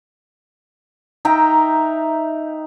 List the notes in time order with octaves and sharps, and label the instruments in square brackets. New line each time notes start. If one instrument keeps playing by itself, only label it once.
[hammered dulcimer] D#4 E5 G5 A#5